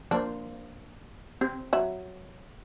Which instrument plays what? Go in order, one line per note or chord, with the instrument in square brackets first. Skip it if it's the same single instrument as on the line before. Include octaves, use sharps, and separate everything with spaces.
[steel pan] F3 A#3 C5 [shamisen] D4
[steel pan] C4 [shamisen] G4
[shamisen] F#3 E5 B5